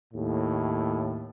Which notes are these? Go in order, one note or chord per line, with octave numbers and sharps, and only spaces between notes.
D#2 A2